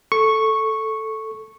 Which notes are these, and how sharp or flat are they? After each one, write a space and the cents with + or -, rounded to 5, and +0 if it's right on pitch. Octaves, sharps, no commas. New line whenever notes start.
A4 +0 C#6 -5